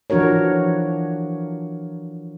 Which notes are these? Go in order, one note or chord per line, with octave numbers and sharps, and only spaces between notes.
E3 F3 D4 F#4 A#4 C#5